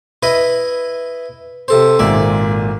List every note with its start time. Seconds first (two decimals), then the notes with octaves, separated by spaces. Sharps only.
0.23 E4 B4 D#5
1.68 C3 A4 C5
1.99 G#1 A#2 D5 E5